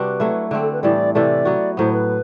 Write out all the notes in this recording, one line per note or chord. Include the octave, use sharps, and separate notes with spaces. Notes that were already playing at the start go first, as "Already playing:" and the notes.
Already playing: C3 G3 D4 F#4 B4
F#3 A3 E4
D3 A3 C4 A4
A4
B4
A2 E3 G3 D5
C3 E3 A3 D5
F#3 B3 F#4
A2 F#3 B3 C5
B4